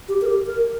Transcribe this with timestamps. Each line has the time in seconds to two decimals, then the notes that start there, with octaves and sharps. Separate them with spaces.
0.09 G4
0.21 A#4
0.26 G4
0.46 A#4